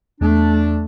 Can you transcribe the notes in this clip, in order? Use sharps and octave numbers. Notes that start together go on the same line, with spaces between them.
E2 A3 D4